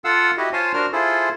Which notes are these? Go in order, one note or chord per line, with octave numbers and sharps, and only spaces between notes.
F4 A4 F5 F#5 E6
E4 F#4 G4 D#5
F4 C5 C#5 F5 G#5 A5
D4 F#4 A#4 C5 F6
E4 F4 G#4 A4 C5